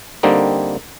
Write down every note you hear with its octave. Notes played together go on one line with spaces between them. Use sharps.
D3 G3 A#3 C4 D#4